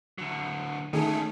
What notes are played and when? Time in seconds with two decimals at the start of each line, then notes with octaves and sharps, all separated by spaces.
0.18 D3 F#3
0.93 D#3 A3 C#4 G#4 A4